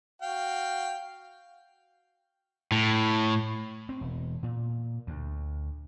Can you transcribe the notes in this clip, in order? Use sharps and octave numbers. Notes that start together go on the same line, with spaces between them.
F#4 F5 G5
A2
C4
E1
A#2
D2